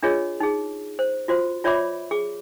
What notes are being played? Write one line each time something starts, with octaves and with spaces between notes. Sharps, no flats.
D4 F4 G#4 C#5 D#5
D#4 G#4
C5
F4 F#4 C5
F4 C#5 D5 E5 B5 D6
G#4 D6